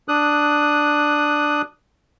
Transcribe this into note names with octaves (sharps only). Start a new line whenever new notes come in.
D4 D#6 F#6